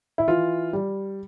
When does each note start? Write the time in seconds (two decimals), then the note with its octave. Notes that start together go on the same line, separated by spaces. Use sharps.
0.18 E4
0.28 E3 F4
0.73 G3